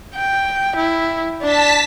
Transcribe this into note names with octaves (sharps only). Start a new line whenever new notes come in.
G5
E4
D4 A5 B6